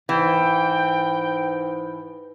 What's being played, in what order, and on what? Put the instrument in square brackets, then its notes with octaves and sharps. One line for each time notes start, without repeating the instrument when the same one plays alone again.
[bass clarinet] G#2 [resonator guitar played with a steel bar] E3 [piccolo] G5